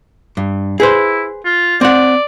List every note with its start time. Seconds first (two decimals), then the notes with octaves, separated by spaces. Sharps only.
0.37 G2
0.80 E4 G#4 B4 C5
1.45 F4
1.81 C4 D5 F#5